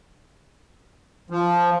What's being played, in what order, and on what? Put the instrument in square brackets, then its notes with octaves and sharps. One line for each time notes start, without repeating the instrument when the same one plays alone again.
[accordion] F3